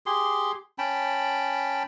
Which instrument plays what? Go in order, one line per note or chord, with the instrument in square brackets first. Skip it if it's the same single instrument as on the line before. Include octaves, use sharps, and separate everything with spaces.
[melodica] G4 G#4 C6
C#4 G5 A5 B5